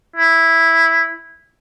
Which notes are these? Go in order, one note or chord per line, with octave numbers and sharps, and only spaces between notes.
E4